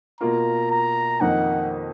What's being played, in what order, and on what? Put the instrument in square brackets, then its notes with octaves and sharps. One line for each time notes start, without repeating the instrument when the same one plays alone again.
[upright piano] B2 A#3 F4 [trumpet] A#5
[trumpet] A#5
[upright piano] F2 D#3 A#3 D#4 [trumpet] F#5